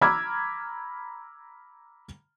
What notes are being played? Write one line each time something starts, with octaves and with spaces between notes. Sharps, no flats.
A#5 B5 D6 E6 F6 G#6